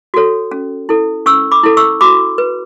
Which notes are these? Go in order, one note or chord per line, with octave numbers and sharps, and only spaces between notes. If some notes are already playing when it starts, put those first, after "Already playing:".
F#4 A4 C#5
C#4
E4 A4
C#4 C#6 E6
B5 D6
E4 A4
C#6 E6
F#4 B5 D6
B4